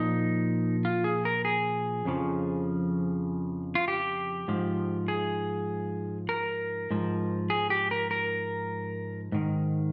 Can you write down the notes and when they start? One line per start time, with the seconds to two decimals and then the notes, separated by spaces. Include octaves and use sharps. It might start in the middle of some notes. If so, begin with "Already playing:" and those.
Already playing: A#2 F3 D#4
0.85 F4
1.04 G#4
1.25 A#4
1.45 G#4
2.05 F2 C#3 F3
3.75 F4
3.88 G4
4.48 G#2 F3
5.08 G#4
6.29 A#4
6.91 G#2 F3
7.50 G#4
7.70 G4
7.91 A#4
8.11 A#4
9.32 G#2 D#3